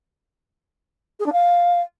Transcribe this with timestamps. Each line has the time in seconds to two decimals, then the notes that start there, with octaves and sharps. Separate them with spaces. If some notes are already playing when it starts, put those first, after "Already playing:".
1.19 G#4
1.26 D4
1.32 F5